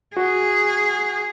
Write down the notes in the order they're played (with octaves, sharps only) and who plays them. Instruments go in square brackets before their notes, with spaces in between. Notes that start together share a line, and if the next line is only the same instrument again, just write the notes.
[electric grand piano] F#4 [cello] G#4